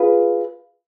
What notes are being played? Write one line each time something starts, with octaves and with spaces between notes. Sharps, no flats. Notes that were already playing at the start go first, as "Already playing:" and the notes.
Already playing: F4 G#4 B4